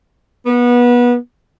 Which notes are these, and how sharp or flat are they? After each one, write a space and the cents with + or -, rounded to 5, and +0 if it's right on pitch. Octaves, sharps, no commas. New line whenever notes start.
B3 -25